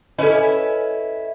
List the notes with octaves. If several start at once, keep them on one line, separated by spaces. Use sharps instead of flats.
C#4 E4 A4 B4 D#5